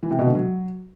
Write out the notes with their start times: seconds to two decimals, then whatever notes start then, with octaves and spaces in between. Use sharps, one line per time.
0.03 E3
0.11 C3
0.19 B2
0.27 D3
0.35 F#3